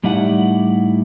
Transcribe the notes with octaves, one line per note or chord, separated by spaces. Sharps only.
A2 G3 D#4 E4 D5 F#5